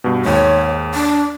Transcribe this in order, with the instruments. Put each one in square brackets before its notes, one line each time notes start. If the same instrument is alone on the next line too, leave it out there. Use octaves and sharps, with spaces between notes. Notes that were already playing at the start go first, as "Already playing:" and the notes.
[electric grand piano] G2 B2
[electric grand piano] D#2 G#2 [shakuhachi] C#5
[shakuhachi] D4